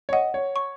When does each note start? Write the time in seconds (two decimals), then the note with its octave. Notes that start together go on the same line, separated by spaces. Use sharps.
0.09 C#5
0.12 D#5 F#5
0.34 C#5
0.56 C#6